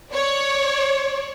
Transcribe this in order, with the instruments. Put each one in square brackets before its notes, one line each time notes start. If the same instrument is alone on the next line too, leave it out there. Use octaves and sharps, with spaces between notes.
[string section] C#5 D5